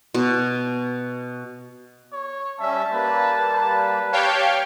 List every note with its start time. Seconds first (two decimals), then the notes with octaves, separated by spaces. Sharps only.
0.14 B2
2.13 C#5
2.60 G3 C#4 E5 A5
2.92 G3 A#3 B4
3.55 B4
4.12 G4 C#5 F5 G5 A5